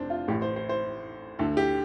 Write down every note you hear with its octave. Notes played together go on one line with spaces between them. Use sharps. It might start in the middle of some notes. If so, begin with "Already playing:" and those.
Already playing: F1 C3 D4 C5
F4
A1 A2 G4
C5
C5
C5
D2 D3 A4
G4